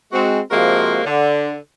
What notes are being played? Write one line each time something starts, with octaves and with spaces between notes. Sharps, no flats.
G#3 C4 F#4
C3 F3 G#3 A#3 F#4 A#4
D3